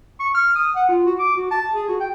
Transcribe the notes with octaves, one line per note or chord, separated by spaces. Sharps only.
C#6
F6
D#6
F#5
F4
F#4
D6
F#4
A5
G#4
F#4
G5